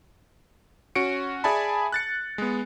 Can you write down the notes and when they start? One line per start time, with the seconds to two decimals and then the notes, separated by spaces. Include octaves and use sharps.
0.95 C#4 F#4 C#7 D7
1.44 G#4 D5 E5 G#5 A5 B5
1.92 F#6 A6 C#7
2.38 G#3 B3